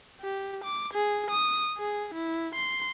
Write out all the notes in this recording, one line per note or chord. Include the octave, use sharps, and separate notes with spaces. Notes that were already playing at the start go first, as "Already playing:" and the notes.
G4
D6
G#4
D#6
G#4
E4
C6